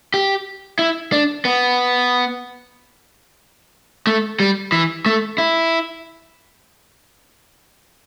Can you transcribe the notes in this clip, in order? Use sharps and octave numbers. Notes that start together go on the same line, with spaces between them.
G4
E4
D4
B3
A3
G3
E3
A3
E4